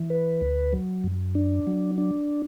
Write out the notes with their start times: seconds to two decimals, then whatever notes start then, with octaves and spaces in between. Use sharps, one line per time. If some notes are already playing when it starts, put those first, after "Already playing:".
Already playing: E3
0.10 B4
0.41 D2
0.73 F#3
1.04 F#2
1.35 D4
1.67 F#3
1.98 D4